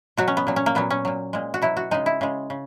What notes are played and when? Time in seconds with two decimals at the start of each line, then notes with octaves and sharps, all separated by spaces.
0.17 B2 F#3 F#4
0.28 C#4
0.37 B3
0.47 A#2 F#3
0.56 C#4
0.66 A#3
0.75 A#2 F#3 B3
0.90 C#4
1.05 A#2 F#3
1.33 A#2 G#3
1.54 F#4
1.62 B2 F#3 E4
1.77 F#4
1.91 C#3 G#3 D#4
2.06 E4
2.21 C#3 G#3
2.50 C#3